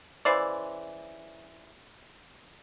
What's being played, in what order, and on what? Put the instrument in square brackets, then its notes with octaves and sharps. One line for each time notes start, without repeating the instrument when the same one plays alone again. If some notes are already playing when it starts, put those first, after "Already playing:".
[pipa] C#3 E3 C5 D5